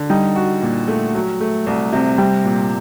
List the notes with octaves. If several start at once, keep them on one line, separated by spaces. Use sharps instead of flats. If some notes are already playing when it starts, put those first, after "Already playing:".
Already playing: D3
G3 D#4
F#4
A#2
A3
F#3
A3
C2
C3
G3 C4
A#2